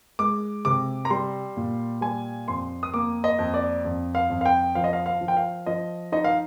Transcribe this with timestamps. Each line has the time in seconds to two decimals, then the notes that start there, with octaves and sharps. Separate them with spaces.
0.19 G#3 D6
0.65 C3 D6
1.05 A#5
1.10 G3 C6
1.57 A#2
2.01 G3 G#5
2.48 F2 C6
2.83 D#6
2.94 A#3 D6
3.24 D#5
3.39 F2
3.54 D5
3.85 F2
4.15 F5
4.30 F2
4.41 F5
4.46 G5
4.75 F3 F5
4.84 D#5
4.93 F5
5.06 F5
5.21 F3
5.28 G5
5.37 F5
5.66 F3 D#5
6.12 D#4 D#5
6.24 F5